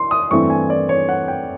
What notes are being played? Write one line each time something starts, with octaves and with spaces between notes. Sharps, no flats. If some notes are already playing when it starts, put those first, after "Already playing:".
Already playing: C6
D#6
G2 E3 A3 C4 C#6
G#5
D5
C#5
F#5
G5